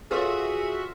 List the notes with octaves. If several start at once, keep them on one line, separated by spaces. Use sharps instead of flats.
F4 F#4 G#4 A4 B4 C#5 E5